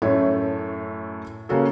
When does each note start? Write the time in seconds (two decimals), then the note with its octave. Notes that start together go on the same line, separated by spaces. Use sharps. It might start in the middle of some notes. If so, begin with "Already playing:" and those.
0.02 F#2 A2 A3 C#5 E5
1.49 C#3 A#3 C#4 F#4 A4